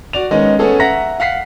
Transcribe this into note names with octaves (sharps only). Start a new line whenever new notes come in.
F#4 D5 F7
D#3 G#3 B3 C#4 D#4
A3 B3 C#4 G#4 A4
E5 F#5 A#5 A#6 B6
F5 F#5 B6 C7